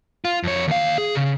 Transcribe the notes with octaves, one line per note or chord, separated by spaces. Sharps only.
F4
F2 C#5
D#2 F5
G#4
C#3